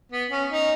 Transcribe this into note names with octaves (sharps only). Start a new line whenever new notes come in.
B3
C#4
D#4